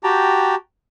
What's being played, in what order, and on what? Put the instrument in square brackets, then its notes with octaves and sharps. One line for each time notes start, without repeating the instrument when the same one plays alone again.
[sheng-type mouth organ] F#4 G4 G5 A5 A#5